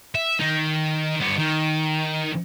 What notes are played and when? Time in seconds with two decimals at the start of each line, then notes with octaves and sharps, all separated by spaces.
0.15 E5
0.40 D#3 D#4
1.20 G2 B3
1.38 D#3